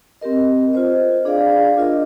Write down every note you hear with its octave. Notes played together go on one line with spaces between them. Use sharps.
C4 G4 A#4 D#5
F4 C5 D#5
D4 G#4 D5 F5
D4 F4 A#4 D#5